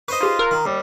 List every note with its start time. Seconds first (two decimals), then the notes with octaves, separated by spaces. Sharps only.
0.08 B4 C5 D#5 C#6
0.21 D#4 F4 G4 G#4
0.39 A#4 E6 F#6
0.51 D#3
0.65 D#2 G3